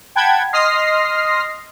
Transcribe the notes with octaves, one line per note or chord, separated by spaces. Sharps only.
F#5 G5 A5 B5 G#6
D#5 C6 D#6 F6 A#6 C7